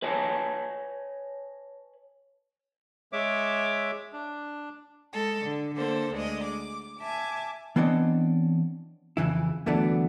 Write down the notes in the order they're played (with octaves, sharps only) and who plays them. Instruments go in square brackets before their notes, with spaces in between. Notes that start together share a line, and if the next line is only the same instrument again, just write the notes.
[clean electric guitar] B4 C#5 D#5 G#5 A5
[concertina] G#3 C#5 E5 D6
D4
[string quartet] G#3 A4
D3
D3 A#3 A4 C5
D2 G#3 D5 D#5
D6
E5 G#5 A5 D6
[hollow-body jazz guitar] E3 B3 C4 D4 C#5 D#5
F2 C#3 E3 E4
D2 E3 F#3 A3 B3 D4